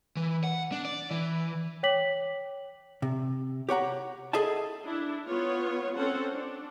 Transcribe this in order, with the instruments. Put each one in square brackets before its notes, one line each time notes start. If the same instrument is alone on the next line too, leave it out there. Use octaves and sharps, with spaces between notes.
[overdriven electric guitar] E3
F#5
D4
D5
E3
[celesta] C#5 G5 D6 B6 F#7
[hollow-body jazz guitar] C3
G4 C#5 F#5 A#5
G#4 A4 D#5 E5 A5
[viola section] D4 E4
B3 F4 C#5
C4 C#4 A4 C5 F#5
D4